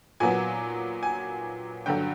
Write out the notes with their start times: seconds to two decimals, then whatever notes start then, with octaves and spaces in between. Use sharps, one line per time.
0.20 A#2 F#3 B3 G#5
1.03 G#5
1.86 G2 D3 F#3 G5